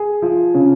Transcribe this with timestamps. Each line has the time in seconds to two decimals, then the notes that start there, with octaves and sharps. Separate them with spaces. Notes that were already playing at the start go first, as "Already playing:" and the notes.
Already playing: G#4
0.22 F3
0.54 C#3